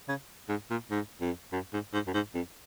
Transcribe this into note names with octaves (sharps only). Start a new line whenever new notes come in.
C#3
G#2
A#2
G#2
F2
F#2
G#2
G#2
F#2
G#2
F2